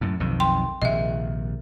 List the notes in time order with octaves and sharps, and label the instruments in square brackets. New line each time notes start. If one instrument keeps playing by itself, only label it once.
[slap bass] F#2 A2
B1 F2 D#3
[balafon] G5 C6
[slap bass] A#1 C3 D#3 [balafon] D#5 E5